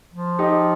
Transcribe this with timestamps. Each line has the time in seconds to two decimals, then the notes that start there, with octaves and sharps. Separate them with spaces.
0.14 F3
0.39 D#4 G4